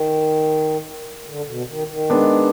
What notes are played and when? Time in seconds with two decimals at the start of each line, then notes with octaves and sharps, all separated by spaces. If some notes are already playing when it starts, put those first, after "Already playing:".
Already playing: D#3
1.27 D3
1.48 B2
1.69 D#3
1.90 D#3
2.10 G#3 B3 D4